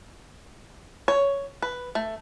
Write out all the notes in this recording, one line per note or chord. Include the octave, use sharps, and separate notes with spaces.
C#5
B4
A3